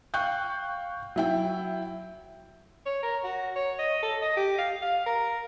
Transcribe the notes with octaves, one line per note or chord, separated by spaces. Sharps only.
F5 G5 C#6 F#6 G6
F#3 E4 G5
C#5
A#4
F#4
C#5
D#5
A4
D#5
G4
F5
F5
A#4